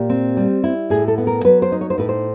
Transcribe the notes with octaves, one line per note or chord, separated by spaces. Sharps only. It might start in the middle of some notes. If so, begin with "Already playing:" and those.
Already playing: A#2 G4
C4
G3
E4
A2 G#4
A4
B3
A#4
F#3 B4
C5
D#4
C#5
C5
A2 B4
C5